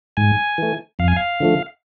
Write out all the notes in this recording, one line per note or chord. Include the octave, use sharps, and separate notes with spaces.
G#2 G#5
E3 A3
F2 F5
G#5
F5
D3 F3 A3